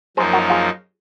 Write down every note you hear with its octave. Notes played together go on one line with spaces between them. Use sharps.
F#2 F3 A#3 D#4 G#4 C5
F#4 A#4
F4 G#4